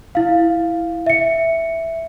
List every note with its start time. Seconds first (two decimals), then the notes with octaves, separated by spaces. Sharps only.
0.15 E4 F5
1.06 E5 C#7